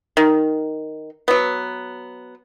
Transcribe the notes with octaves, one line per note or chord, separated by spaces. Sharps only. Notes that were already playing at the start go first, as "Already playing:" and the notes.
D#3
F#3 B3